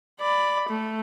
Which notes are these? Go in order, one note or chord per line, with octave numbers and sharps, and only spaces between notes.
D5 B5
A3